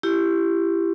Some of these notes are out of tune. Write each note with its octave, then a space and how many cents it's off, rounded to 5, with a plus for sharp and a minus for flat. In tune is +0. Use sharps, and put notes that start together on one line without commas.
E4 +25 G4 +0